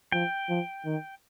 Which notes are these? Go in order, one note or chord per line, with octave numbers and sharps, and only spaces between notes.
F3 G5
F3
D#3